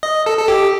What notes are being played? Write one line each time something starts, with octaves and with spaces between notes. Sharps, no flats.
D#5
A4
A4
G4